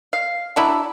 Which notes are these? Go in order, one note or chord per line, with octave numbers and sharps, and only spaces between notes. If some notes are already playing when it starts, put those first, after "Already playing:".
F5
F#3 D4 E4